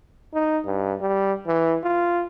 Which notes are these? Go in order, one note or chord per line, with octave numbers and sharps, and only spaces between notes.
D#4
G2
G3
E3
F4